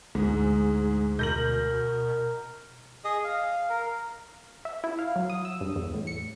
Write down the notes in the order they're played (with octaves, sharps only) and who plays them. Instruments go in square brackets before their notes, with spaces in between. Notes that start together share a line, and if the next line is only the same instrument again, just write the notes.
[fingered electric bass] D2 [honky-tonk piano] G#2 [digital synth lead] G#4
[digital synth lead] B2 [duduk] A#4 [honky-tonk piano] G6 A#6 F#7
[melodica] G#4 D#5 D#6
F5
A#4
[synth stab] E5
E4
F5
F#3
D#6
E6
G2
E2
A2
C#7